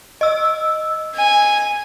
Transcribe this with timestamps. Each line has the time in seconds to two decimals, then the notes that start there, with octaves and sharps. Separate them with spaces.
0.21 D#5 E6
1.16 G#5